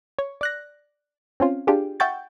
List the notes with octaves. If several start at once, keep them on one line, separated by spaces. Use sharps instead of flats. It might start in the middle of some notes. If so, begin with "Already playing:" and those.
C#5
D5 F#6 A#6
C4 C#4 F4
D4 F4 G4 G#4
E5 F#5 G5 C#6 G6 A6